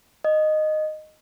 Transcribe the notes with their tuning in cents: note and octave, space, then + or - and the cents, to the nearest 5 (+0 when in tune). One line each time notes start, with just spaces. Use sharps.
D#5 -10